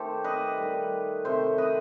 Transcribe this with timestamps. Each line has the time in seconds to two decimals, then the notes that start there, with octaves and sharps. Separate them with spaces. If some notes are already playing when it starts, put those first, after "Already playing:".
Already playing: D#3 A3 G4 A4 C5
0.24 B4 D#5
0.58 D#3 G3
1.25 C3 D#3 A3 C5 E5
1.58 B4 D#5